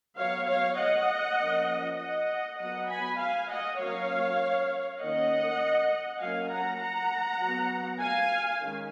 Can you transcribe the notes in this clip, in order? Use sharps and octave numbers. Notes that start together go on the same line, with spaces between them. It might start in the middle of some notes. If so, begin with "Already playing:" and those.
F#3 B3 C#5 F5
C#5 F5
D#5 F#5
F3 A#3 C#4
D#5 F#5
F#3 B3 D#5 F#5
G#5 B5
F5 G#5
D#5 F#5
F#3 A#3 C#4 C#5 F5
D#3 A#3 C#4 D#5 F#5
F#3 A#3 C#4 F5 G#5
F#5 A#5
F#5 A#5
F#3 B3
F5 G#5
D#3 G#3 C#4